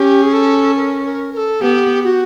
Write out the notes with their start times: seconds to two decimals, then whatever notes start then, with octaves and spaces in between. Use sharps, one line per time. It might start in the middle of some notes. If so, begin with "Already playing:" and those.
Already playing: C#4 G4
0.22 G#4
0.33 A4
0.76 A#4
1.05 A#4
1.33 A#4
1.37 A4
1.61 B3 G4
2.04 F#4